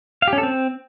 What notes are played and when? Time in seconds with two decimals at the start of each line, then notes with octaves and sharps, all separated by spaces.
0.22 F5
0.28 G4
0.33 C#4
0.38 A4
0.43 C4